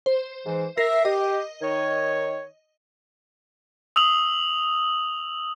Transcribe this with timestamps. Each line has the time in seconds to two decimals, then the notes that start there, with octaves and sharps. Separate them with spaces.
0.06 C5
0.46 G#2 E3
0.78 A#4 E5 A#6 C7
1.05 G4 D#5
1.62 D#3 C#5
3.96 D#6 E6 F7 F#7